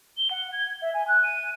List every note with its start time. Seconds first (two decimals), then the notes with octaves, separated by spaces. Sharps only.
0.17 G7
0.30 F#5
0.52 G#6
0.82 E5
0.94 G#5
1.07 F#6
1.23 D#7